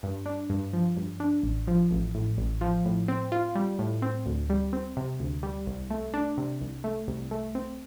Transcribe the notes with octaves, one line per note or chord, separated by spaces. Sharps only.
G2
D4
G2
F3
G2
D4
A1
F3
A1
A2
A1
F3
A2
C4
F4
G3
A2
C4
D2
G3
C4
C3
D2
G3
C2
A3
D4
C3
C2
A3
C2
A3
C4